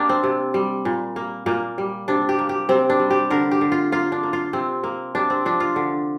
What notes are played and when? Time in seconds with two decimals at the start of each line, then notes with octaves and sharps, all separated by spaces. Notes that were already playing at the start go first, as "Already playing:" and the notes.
Already playing: A#3 D4 G4
0.09 C4
0.24 C3
0.54 G3
0.85 A#2
1.16 A#3
1.46 A#2 A#3
1.78 G3
2.08 C3 D4
2.29 G4
2.39 A#3
2.49 G4
2.69 C3 C4
2.90 D4
2.99 G3
3.10 G4
3.30 D3 A#4
3.51 G4
3.61 D3
3.72 F4
3.92 A#3 F4
4.12 D4
4.23 A#3
4.33 F4
4.53 C3 C4
4.83 A#3
5.15 C3 D4
5.30 C4
5.45 F3 D4
5.60 F4
5.76 D3